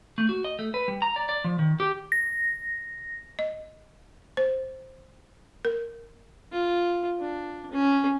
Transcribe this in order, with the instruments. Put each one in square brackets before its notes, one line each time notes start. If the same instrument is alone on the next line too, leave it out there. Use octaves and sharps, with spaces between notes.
[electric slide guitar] A3
F#4
D#5
A3
B4
G3
A#5
D5
D5
F3
D#3
G4
[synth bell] A#6
[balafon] D#5
C5
A#4
[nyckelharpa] F4
D4
C#4